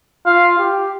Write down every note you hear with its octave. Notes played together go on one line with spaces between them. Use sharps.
F4 F5
G4